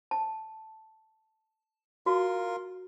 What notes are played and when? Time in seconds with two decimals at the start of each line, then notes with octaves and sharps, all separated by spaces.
0.11 A5
2.06 F4 F#4 A#4 C6